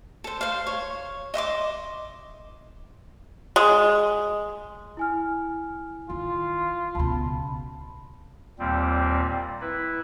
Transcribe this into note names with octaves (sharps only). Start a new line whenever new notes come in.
A4 C5
C5 F5
C#5
D#5 E5 C6 D6
G#3
E4 G#5 F6
D#3 F4
C#2 B2 A5 B5
D#2 A#2 G3 C4
E4 B4